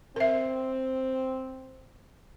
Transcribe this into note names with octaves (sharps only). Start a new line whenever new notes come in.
C4 A#4 E5